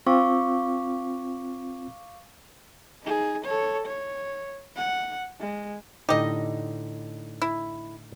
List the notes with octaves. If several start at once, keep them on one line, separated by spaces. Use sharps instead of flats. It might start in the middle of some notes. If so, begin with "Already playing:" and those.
C4 F4 F5 C#6 D6
D#4 G#4
A4 C#5
C#5
F#5
G#3
A2 D3 D#4 G4 D#5
E4